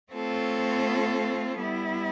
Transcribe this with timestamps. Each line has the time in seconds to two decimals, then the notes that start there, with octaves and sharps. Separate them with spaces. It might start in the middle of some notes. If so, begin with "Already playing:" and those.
0.12 A3 C4 F4 A4 C#5
1.60 G3 B3 E4